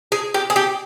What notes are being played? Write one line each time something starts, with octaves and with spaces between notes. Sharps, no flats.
G#4
G4
G#4
G4